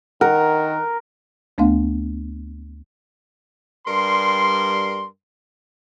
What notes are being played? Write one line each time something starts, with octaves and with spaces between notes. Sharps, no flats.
D#3 A#4 F#5
D2 A3 B3 D4 F5
G2 G3 A#4 C6